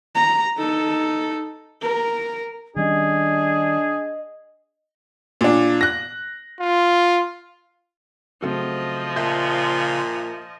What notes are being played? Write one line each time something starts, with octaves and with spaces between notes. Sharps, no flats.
A#5
D#4 A4
A#4
D#3 G3 C#4 D4 G#4 D#5
A#2 D4
F#6 A#6
F4
C#3 F3 F#3 A3 C4 D#5
A#2 E5 A5 G6